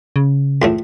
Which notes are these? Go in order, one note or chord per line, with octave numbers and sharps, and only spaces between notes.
C#3
C#2 A2 A3